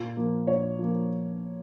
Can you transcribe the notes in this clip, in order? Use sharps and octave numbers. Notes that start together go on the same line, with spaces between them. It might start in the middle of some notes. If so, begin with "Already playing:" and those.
Already playing: A#2
F3 A#3
A#2 C#5
F3 A#3